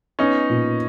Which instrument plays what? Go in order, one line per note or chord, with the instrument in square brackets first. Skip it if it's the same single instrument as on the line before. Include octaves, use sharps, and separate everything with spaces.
[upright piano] B3 [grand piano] C#4 D#4
[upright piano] A#2